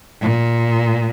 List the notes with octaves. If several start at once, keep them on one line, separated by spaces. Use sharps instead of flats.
A#2